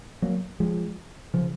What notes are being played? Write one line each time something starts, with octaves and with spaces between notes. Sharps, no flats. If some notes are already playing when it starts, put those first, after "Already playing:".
F#3 A#3
F3 G#3
C#3 F3